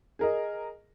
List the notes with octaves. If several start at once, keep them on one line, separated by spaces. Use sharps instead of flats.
G#4 A#4 D#5